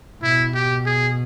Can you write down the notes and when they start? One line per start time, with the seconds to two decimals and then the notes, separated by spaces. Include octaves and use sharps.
0.22 B2 E4
0.54 G4
0.86 G#4